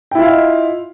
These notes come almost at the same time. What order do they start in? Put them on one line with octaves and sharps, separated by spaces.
G5 E4 F4 F5 D#5